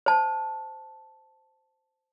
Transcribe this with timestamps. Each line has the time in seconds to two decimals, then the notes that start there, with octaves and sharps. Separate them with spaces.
0.06 C5 A5